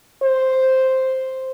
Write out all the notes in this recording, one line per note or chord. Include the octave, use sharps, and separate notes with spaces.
C5